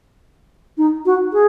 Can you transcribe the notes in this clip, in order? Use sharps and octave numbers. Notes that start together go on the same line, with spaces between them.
D#4
F#4
G#4